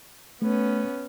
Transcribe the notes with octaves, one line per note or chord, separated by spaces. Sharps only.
A3 B3 C#4